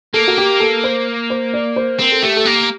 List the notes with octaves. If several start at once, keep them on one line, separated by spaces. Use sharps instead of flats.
A#3 A4
F#4
G4
A4
C5
C5
D5
C5
C4 A#4
A4
A3 G4
A4
A#3 G4